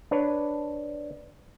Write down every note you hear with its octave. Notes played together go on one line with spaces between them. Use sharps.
D4 B4 C#5